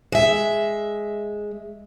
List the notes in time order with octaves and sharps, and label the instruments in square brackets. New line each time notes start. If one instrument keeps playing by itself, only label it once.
[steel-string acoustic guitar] G#3 E5